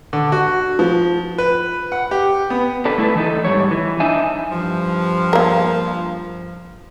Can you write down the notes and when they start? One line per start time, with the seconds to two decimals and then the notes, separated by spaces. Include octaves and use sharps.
0.13 D3
0.32 F#4
0.79 F3
1.38 B4
1.92 F#5
2.11 G4
2.50 B3
2.85 D4 A4 B4
2.98 A3 E4 F#4 A4 B4
3.15 E3 D#4 A4
3.45 G#2 G3 C#5
3.71 E3
4.00 D4 D#4 E5 G#5
4.50 G2 F3
5.33 A#3 A#4